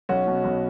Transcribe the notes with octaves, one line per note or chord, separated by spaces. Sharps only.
B1 C#4 F#4
B2
B1